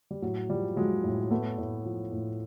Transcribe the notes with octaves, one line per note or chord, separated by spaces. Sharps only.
G3
A2 F#3
F3 G3
F3 F#3 G#3
A2
A2 A3 B3
A2
F3
A2